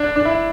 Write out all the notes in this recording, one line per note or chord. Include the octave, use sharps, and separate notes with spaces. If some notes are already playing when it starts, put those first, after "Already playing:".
Already playing: D4
D4
E4